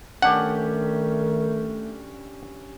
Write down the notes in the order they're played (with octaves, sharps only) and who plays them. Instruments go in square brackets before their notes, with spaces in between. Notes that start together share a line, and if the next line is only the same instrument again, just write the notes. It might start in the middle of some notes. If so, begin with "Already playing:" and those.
[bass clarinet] D#3 [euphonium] A3 [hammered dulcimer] C#4 D4 G4 [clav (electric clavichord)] F#5